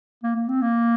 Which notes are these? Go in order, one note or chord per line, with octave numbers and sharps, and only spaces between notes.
A#3
A#3
C4
A#3